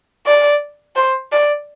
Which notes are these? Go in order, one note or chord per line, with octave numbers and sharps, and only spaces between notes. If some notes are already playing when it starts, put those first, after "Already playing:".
D5
C5
D5